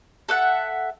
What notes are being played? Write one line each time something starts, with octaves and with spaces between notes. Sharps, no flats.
A4 E5 F#5